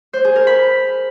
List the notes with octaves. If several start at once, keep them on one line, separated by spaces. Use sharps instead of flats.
C5
G#4
A#4
B5